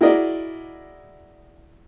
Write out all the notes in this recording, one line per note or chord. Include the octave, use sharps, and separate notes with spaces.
E4 F#4 G#4 A#4 D5 D#5